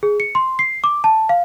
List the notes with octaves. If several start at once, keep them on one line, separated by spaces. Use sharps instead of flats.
G#4
C#7
C6
C7
D6
A5
F5